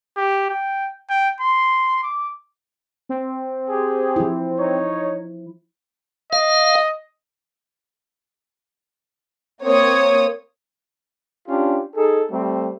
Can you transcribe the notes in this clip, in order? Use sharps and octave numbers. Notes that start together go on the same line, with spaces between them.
G4
G5
G5
C6
D6
C4
G4 G#4
F3 E4
D#4 C#5
D#5 F5
A#3 C4 C#5 D#6
C#4 D4 F4 G4
D#4 G#4 A4
G3 A3 C4